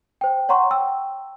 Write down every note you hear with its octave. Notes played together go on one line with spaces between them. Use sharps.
C5 G5
C#5 F#5 A#5 C6 C#6
G5 E6